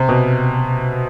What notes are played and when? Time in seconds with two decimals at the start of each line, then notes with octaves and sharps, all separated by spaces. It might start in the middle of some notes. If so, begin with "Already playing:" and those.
Already playing: C3
0.09 B2